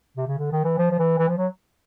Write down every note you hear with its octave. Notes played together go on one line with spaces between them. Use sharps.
C3
C#3
D3
D#3
E3
F3
F3
E3
E3
F3
F#3